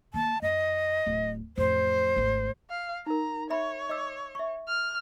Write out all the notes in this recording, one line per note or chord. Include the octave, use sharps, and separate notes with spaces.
D#3 A#3 A5
F#2 D#5
D1
A1 F2 C5
G#1 D2
F5
D#4 A#4 A#5
C#5 E5 B5 C6
D#5 D6 E6
E5 C#6
F6